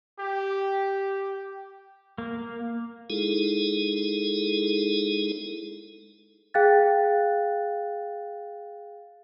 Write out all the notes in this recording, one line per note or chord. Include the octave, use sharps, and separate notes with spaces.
G4
A#3
G#3 D#4 E4 G#4 A4
G#4 F5 G5 F#6 A6